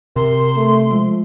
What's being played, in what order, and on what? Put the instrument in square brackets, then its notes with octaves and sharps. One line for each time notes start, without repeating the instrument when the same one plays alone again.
[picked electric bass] C3 [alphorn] A#4 [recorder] C6
[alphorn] A3
[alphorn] F3 [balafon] G#3